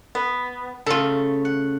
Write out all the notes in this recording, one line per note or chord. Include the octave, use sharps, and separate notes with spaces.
B3
C#3 A3 F4 A4
F#5